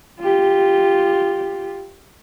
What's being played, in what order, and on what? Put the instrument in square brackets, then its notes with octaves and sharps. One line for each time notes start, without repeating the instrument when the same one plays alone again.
[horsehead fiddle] F4 G4